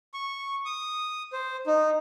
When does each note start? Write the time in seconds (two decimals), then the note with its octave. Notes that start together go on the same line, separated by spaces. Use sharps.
0.14 C#6
0.66 D#6
1.33 C5
1.67 D#4